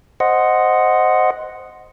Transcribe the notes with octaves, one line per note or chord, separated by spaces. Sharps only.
C5 D#5 F#5